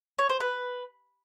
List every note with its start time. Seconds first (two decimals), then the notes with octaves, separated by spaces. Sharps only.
0.19 C#5
0.29 C5
0.40 B4